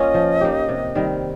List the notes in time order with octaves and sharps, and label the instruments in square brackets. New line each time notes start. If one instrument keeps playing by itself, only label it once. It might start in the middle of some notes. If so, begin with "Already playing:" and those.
Already playing: [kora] A#3 C#4 F4 [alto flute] D#5
[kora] F3
A#3 D#4 G4
C3
D#3 G3 C4